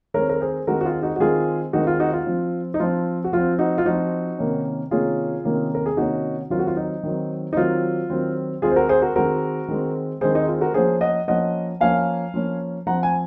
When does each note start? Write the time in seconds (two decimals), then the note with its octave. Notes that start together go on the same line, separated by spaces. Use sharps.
0.14 D#3 G#3 C4 A#4 C#5
0.29 A#4
0.40 G#4 C5
0.67 D#3 G#3 C4 F#4 A#4
0.81 F#4
0.85 F4 G#4
1.02 D#4 F#4
1.16 F#4
1.20 D#3 G#3 C4 F4 G#4
1.73 D#3 G#3 C4 D#4 F#4
1.87 F4
2.00 D#4 F#4
2.13 F4
2.26 F3 C4
2.74 D#4
2.80 F3 C4 F4
3.24 F#4
3.32 F3 C4 F4
3.59 D#4 F#4
3.78 F4
3.85 F3 C4 D#4 F#4
4.38 C3 D#3 A#3 C#4
4.91 C3 D#3 A#3 C#4 F4 G#4
5.44 C3 D#3 A#3 C#4
5.75 A#4
5.86 G#4
5.97 C3 D#3 A#3 C#4 D#4 F#4
6.50 D#3 F#3 C4 F4
6.59 F#4
6.67 F4
6.77 D#4
7.03 D#3 F#3 C4
7.53 D#4
7.56 D#3 F#3 C4 F4
8.10 D#3 F#3 C4
8.62 D#3 G#3 C4 F4 G#4
8.71 C5
8.76 F#4 A#4
8.89 G#4 C5
9.02 F#4 A#4
9.16 D#3 G#3 C4 F#4 A#4
9.68 D#3 G#3 C4
10.21 D#3 G#3 C4 G#4 C5
10.35 D#4
10.48 F4
10.61 F#4 A#4
10.74 F3 A#3 C#4 G#4 C5
11.01 D#5 F#5
11.28 F3 A#3 C#4 D#5 F#5
11.81 F3 A#3 C#4 F5 G#5
12.34 F3 A#3 C#4
12.87 F3 C4 F#5 A#5
13.03 G#5